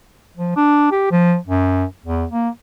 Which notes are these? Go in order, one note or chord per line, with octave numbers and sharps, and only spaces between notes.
F3
D4
G4
F3
F#2
E2
A#3